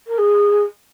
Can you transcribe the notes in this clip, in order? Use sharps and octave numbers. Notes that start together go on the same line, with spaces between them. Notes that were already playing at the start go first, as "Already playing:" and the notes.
A#4
G#4